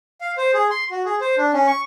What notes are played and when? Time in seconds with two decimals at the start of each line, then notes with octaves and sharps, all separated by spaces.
0.21 F5
0.38 C5
0.54 G#4
0.70 C6
0.91 F#4
1.05 G#4
1.21 C5
1.38 D4
1.54 C#4
1.67 C#6